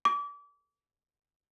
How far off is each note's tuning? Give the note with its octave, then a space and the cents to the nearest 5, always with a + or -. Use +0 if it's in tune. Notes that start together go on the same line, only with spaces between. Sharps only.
D6 -30